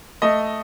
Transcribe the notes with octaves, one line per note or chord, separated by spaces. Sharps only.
A3 D#5